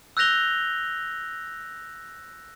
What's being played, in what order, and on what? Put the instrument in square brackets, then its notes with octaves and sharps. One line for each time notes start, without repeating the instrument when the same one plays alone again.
[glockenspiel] E6 F#6 G6 A#6 F7 G7